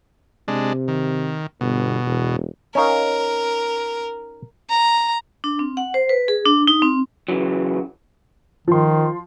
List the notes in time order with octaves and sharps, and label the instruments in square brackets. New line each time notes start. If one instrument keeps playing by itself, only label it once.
[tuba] C3 [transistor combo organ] G#3 D4
[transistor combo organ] D#3
[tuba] G1 [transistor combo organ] B2
[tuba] E1
[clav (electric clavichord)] C#4 D#4 F5 [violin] A#4
[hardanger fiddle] A#5
[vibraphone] D4
C4
F#5
C5
B4
G#4
D4
D#4
C4
[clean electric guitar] C#3 E3 F#3
[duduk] D#3 [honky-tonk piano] F3 C6